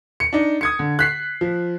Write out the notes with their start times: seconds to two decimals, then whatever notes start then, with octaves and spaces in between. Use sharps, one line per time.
0.20 C#7
0.33 D4 D#4
0.61 D#6 G#6 C#7
0.79 D3
0.99 F#6 B6 C7
1.41 F3